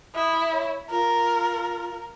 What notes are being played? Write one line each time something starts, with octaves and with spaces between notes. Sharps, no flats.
E4 D#6
C#5
F4 A#4